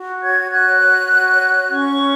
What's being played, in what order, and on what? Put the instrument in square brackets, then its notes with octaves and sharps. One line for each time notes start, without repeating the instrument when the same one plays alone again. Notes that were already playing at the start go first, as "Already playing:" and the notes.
Already playing: [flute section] F#4
C#5 G#6
F#4 F#6
C#5
F#4
C#5
C#4 C#6
C#5